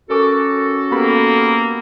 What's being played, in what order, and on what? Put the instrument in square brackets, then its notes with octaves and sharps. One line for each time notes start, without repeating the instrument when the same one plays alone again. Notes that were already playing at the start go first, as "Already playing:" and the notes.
[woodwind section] C#4 F#4 [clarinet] A4 [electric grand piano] A#4 D6
[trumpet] A#3 [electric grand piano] B3 G4 B5